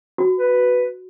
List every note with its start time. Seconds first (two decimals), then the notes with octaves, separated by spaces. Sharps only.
0.18 F#4
0.38 B4